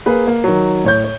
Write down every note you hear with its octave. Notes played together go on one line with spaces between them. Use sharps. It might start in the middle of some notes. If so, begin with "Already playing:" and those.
A#3 G#4 B4
A#3
D#3 F#3
A2 C#5 G6
C#5